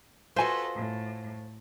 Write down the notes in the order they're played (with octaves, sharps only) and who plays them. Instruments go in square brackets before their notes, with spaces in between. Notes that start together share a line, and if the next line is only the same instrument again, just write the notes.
[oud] F4 F#4 [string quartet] A4 B4 D#5 [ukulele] C5 G#5
[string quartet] A2